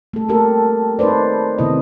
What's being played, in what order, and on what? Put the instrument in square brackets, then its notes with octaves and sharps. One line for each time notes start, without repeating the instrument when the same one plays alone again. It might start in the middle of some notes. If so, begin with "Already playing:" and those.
[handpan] A3 A4
A3 A#3 G4 A4 A#4
D#4 A4 B4 C5 D5
C3 D#3 B3 E4 D#5